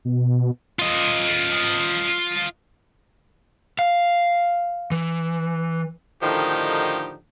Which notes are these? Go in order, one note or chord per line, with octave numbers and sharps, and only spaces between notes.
B2
F4 D#5
F5
E3
A2 D3 D#3 F3 D#4 G4